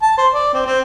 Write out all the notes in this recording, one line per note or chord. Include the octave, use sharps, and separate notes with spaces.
A5
C5
D5
C4
C4